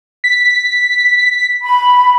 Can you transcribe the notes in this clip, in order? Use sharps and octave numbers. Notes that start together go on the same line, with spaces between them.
B6
B5